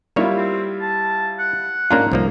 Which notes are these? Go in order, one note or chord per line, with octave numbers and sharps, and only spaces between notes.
G3 A#3 E4 F4 C#5
C4
A5
F#5
G#2 A#3 C#4 D4 F4 A#5
C2 F3 A#3